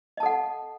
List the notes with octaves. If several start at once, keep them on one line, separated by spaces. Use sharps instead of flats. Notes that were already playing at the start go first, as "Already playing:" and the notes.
A4 D#5 F#5 A5